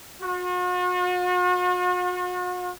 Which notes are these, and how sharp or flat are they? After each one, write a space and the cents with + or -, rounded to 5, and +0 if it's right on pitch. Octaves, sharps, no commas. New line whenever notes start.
F#4 -45